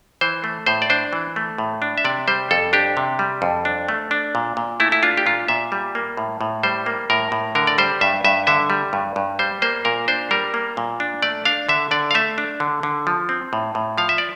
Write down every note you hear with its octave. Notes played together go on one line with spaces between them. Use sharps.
E3 C5
A3
A2 C5
D5
D4 C5
E3
A3
A2
D4
E5
C3 D5
G3 C5
F2 A4
D4 G4
C3
G3
F2
D4
A3
D4
A#2
A#2
A3 E4
E4
D4 F4
G4
A#2 F4
A#2 E5
G3
A#3
A2
A2
G3 C5
A#3
A2 A#4
A2
D3 A#4
D5
G3 C5
G2 E5
G2 E5
D3 E5
G3
G2
G2
G3 C5
A#3 C5
A#2 A#4
D4 C5
G3 A#4
A#3
A#2
D4
A3 D5
D4 F5
D3 E5
D3 D5
F5
A3 E5
D4
D3
D3
F3
C4
A2
A2
F3 F5
E5
D5